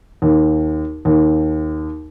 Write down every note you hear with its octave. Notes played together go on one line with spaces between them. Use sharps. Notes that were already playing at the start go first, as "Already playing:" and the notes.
D#2
D#2